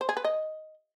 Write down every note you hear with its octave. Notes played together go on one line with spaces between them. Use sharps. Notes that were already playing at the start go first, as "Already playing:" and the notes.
C5
G#4
B4
D#5